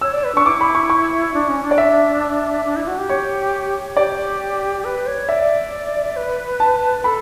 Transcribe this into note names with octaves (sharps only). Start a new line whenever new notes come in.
C#5 E6
D5
B4
D4 C#6
E4 D6
B5
C#6
C#6
D4
C#4
D4
D5
E5
D4
E4
F#4
G4
C#5
G4 D5
B4
C#5
D5 E5
B4
A5
A4 B5